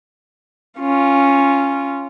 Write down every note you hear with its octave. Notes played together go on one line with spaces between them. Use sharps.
C#4 F4